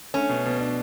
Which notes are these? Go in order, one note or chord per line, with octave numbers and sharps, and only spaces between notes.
A3 C#4
B2
B2
D4